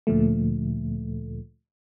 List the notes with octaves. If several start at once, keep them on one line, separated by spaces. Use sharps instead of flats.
D2 A#2 D3 F3 A3